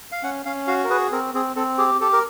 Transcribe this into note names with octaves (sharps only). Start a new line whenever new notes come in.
F5
C#4 F#5
C#4 F5
F#4 F5
A#4
G#4 B4
C4 A#4
C4 G#4
C4 A4
G4 G#4
G4 A4
A#4